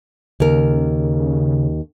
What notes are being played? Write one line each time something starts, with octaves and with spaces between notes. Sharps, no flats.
D#2 C#3 A#4